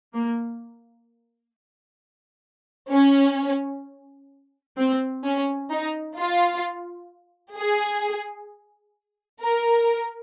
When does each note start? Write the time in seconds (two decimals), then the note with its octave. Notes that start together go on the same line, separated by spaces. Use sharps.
0.14 A#3
2.93 C#4
4.79 C4
5.25 C#4
5.71 D#4
6.18 F4
7.57 G#4
9.42 A#4